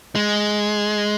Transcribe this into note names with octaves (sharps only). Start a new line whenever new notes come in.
G#3